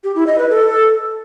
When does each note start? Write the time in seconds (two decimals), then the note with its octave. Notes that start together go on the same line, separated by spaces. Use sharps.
0.04 G4
0.15 E4
0.27 D#5
0.38 B4
0.50 A4